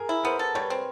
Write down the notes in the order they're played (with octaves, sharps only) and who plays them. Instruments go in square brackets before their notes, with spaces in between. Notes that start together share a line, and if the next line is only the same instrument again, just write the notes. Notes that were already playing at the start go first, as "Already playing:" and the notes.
Already playing: [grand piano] G#4 A#4
[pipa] E4
[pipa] B3 [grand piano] A#4 C5
[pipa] A4
[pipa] G3 [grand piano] B4 C#5
[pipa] C4